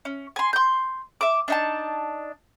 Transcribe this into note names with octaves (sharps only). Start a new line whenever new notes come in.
C#4
G#5 C6
C6 G6
E5 D6
D4 D#4 A5